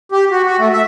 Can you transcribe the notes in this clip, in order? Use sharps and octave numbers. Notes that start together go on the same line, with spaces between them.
G4
F#4
F#4
A3
E5